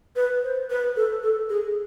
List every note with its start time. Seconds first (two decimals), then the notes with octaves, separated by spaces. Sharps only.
0.16 B4
0.44 C5
0.70 B4
0.97 A4
1.23 A4
1.50 G#4